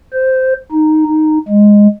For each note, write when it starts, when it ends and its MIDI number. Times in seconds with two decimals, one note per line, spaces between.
0.13 0.53 72
0.72 1.04 63
1.06 1.38 63
1.49 1.87 56